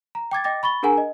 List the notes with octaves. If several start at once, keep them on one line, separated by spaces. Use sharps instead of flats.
A#5
G5 D6 G#6 A6
D#5 G5 D6 A6 A#6
B5 C#6 A6 G7
D4 G#4 A#4 F#5 G#5 A#5
D#5